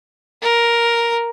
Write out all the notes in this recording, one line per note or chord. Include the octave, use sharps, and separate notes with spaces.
A#4